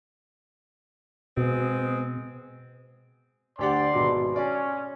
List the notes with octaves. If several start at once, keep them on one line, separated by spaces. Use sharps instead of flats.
B2 G#3 B3 C4
D2 G4 D5 F#5 C6
G#1 B2 F#4
C#4 D5